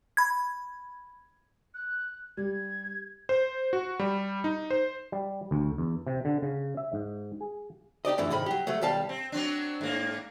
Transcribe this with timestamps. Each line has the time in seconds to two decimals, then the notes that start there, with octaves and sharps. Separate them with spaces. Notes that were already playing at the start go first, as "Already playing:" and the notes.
0.17 B5 G#6
1.74 F#6
2.37 G3 G#6
3.29 C5
3.73 F#4
3.99 G3
4.44 D#4
4.70 C5
5.12 G3
5.51 D2
5.78 E2
6.07 C3
6.25 D3
6.42 C#3
6.77 E5
6.93 G#2
7.41 G#4
8.05 D#4 G4 D5 D#5
8.18 F#2 D3 E3 F#3 A3
8.31 C2 G#2 D#3 B5
8.46 F#3 G4
8.67 F#3 A3
8.81 B1 D#3 G3 F5 A5
9.09 C4
9.32 F#3 C4 D4
9.81 G#2 A#3